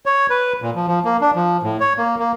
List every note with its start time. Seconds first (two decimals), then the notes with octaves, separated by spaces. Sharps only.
0.06 C#5
0.30 B4
0.62 A#2
0.75 F3
0.88 F3
1.05 A#3
1.21 D4
1.35 F3
1.63 A2
1.80 C#5
1.98 A#3
2.19 A#3